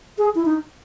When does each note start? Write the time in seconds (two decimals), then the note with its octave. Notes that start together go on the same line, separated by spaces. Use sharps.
0.18 G#4
0.35 E4
0.45 D#4